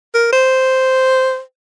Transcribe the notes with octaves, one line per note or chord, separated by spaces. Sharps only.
A#4
C5